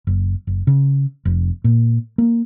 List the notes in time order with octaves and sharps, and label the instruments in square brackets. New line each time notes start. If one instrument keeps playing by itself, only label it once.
[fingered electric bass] F#1
F#1
C#3
F1
A#2
A#3